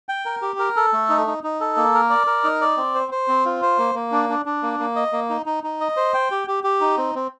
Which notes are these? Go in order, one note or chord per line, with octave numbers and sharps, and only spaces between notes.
G5
A#4
G4
A#4
A4
A3
D#4
D#4
D#4
A4
A#3
A#4
D5
A#4
D#4
D5
C4
C5
C5
C4
F4
C5
A#3
A#3
D4
D4
D4
A#3
A#3
D#5
A#3
D#4
D#4
D#4
D#5
C5
G5
G4
G4
G4
D#4
C4
C4